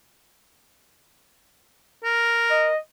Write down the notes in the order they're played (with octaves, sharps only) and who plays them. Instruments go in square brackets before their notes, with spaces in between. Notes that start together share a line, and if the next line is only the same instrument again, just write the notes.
[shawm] A#4
[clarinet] D#5